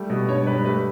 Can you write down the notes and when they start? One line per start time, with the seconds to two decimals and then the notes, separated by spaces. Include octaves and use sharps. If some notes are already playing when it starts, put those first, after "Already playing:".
Already playing: G3 A3
0.10 B2
0.28 G2 C#5
0.47 G3 B4
0.65 A3 B4